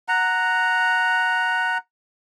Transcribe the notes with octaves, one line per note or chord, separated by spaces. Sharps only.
F#5 A#5